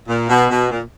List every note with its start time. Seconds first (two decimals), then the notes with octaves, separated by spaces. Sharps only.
0.08 A#2
0.29 B2
0.50 B2
0.70 A#2